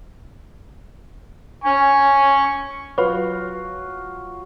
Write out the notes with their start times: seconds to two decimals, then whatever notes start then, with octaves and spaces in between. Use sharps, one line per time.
1.64 G#5 C#6
2.98 F#3 F4 F#4 B4 C#5